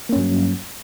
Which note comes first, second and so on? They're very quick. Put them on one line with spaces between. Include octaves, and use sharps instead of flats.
A#3 C#4 G2 F#3